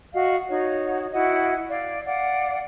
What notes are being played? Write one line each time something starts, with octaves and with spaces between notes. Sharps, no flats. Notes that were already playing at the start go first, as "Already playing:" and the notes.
F#4 D#5 F5
D#4 F#4 C#5
E4 F#4 D#5 F#5
D5 F5
D5 F5 F#5